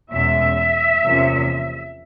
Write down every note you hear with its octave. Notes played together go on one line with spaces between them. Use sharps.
E2 B2 G#3 C#4 E5
E2 C3 F3 A#3 C#4